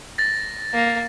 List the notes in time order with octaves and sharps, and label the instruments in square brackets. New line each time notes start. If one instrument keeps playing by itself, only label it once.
[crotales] A6 A#6
[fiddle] A#3